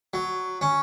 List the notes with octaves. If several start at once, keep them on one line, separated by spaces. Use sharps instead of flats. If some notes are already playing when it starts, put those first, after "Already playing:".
F#3
C#4